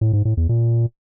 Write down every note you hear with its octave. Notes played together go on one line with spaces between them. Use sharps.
A2
G#2
A2
E2
A#2